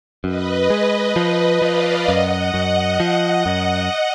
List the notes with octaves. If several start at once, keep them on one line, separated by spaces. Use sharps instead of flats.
F#2 B4 D#5
G#3
F3 B4 D#5
F3 D5 F5
F#2 D#5 F#5
F#2
F3
F#2